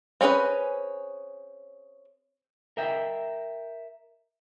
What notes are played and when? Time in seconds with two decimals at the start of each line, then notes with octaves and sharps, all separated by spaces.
0.21 C4 C#4 G#4 A#4 B4
2.77 A#4 D#5 E5 G5